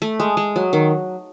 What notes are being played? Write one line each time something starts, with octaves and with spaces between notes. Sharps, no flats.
A3
G#3
G#3
F#3
D#3